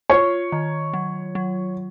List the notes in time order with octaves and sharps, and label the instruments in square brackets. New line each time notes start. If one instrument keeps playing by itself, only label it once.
[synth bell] F4 [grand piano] C#5
[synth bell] D#3
F#3
F#3